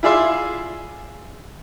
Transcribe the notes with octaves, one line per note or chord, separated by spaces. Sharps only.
E4 F4 G#4 D5 E5 C6